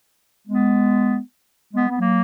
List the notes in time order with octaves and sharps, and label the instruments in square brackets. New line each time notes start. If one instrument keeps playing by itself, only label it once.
[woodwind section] G#3 B3
G#3 B3
B3
F#3 A#3